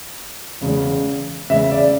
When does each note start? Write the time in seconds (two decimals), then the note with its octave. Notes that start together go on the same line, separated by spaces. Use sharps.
0.61 E2 C#3 G#3
1.50 E2 C#3 G#3 E5
1.72 D5